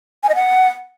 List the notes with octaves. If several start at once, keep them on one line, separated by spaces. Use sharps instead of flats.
G#5
D#5
F#5